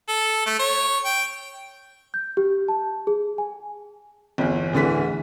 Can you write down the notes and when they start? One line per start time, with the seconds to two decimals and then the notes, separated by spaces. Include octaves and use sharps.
0.08 A4
0.46 A3
0.59 C#5
1.05 G5
2.14 G6
2.37 G4
2.68 A5
3.07 G#4
3.38 G#5
4.38 G1 E2
4.73 D1 D3 E3 B6